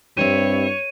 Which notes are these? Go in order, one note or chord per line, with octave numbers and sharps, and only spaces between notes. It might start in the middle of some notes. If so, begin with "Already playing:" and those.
G2 C4 E4 G4 C#5 D#7